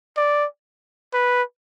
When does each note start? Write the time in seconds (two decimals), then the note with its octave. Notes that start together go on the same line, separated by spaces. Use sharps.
0.17 D5
1.14 B4